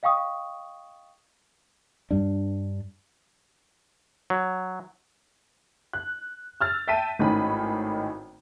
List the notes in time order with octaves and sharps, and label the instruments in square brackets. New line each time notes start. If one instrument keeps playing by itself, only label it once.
[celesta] D#5 F5 G5 C#6 D#6
[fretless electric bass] G2 G3 D4
[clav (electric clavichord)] F#3
[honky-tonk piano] F#6
E6 F6 A6
E5 G5 A5 B6 D#7
G#1 A2 D#3 C#4 B5